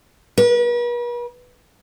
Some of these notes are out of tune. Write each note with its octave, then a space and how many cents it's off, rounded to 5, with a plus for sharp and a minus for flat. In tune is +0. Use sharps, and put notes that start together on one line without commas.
B4 -45